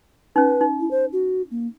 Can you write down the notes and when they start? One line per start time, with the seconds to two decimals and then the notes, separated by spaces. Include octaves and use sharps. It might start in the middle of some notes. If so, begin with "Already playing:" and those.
0.36 C#4 D#4 B4
0.61 D#4
0.80 E4
0.91 C5
1.13 F#4
1.51 A#3